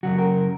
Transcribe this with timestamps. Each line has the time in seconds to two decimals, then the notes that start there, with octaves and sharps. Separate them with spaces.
0.03 F#2 C#3 F#3 F#4
0.18 A#4